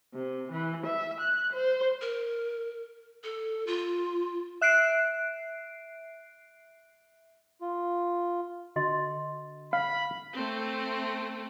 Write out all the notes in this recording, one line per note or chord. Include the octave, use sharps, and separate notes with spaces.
C3
E3
E5
F#6
C5
A#4
A4
F4
E5 F#6 C7 D7
F4
D3 F#4 D#5 C6
F5 B5
A3 C4